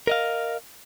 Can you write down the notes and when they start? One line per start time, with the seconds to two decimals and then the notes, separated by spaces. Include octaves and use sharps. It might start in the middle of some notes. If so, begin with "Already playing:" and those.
0.07 A#4 D#5 F5